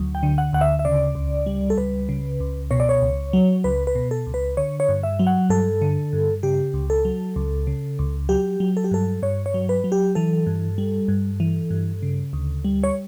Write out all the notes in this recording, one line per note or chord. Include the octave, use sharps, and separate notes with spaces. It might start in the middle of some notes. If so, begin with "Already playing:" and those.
Already playing: D2 F#3
G5
D3
F#5
D2 F#5
E5
E5
C#3 D5
C#2
G3
A4
C#2 B4
C#3
C#2
B2 C#5
D5
C#5
C#2
F#3
C#2 B4
B4
B2
A4
C#2
B4
D3 C#5
C#5
G2
E5
F#3
F#5
G2 A4
D3
G2
C#3 G4
C#2
A4
F#3
C#2
C#3
C#2
F#3 G4
F#3
A4
G4
G2 A4
G2 C#5
C#5
F#3
B4
F#3
G4
E3 A4
G2
G3
G2
E3
G2
C#3
D2
G3
C#5